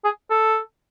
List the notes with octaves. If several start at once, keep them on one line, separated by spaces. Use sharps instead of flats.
G#4
A4